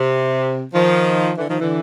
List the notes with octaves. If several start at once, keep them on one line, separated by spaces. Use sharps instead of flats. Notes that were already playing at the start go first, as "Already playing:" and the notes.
Already playing: C3
D#3 F3
D3 E3
D#3 F3
D3 E3